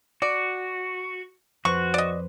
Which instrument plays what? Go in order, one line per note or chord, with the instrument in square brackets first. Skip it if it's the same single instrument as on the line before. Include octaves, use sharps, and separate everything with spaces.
[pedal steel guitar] F#4 [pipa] D5
[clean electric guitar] F2 B4 C5 [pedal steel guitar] F#4 [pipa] C#6
[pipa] D5 D#5